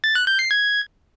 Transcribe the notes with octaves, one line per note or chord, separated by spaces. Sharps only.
A6
F#6
G6
C7
G#6